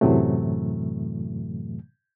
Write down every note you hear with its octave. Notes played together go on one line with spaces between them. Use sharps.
F#2 A2 C3 E3 F#3 A3